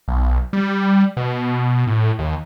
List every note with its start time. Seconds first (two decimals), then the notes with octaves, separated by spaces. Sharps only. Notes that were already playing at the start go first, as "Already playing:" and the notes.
0.08 B1
0.53 G3
1.17 B2
1.87 A2
2.19 D#2